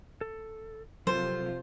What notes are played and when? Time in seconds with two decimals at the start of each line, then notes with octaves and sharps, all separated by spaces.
0.21 A4
1.07 C3 F3 F#3 F4 A4 A#4 C5